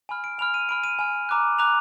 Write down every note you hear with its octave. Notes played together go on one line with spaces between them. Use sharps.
G#5 B5 F6
D7
G#5 B5 F6 F7
D#7
G#5 B5 F6 D7
D#7
G#5 B5 F6
A#5 D6 F#6
A#5 D6 F#6 F7